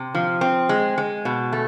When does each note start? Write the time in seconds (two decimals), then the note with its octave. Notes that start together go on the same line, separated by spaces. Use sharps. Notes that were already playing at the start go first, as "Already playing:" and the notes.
Already playing: C3
0.15 F3
0.41 C4
0.69 G#3
0.98 G#3
1.25 B2
1.53 A3